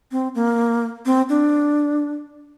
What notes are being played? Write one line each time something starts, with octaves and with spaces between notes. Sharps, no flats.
C4
A#3
C4
D4